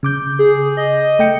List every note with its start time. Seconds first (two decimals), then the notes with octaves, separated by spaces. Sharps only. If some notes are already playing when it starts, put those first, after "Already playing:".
0.03 C#3 D6 G6
0.39 G#4
0.77 D#5
1.19 A3 G5 C#7